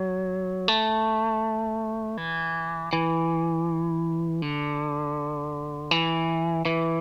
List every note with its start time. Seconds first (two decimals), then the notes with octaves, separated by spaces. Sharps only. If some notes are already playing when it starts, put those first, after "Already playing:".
Already playing: F#3
0.68 A3
2.17 E3
2.93 E3
4.42 D3
5.91 E3
6.65 E3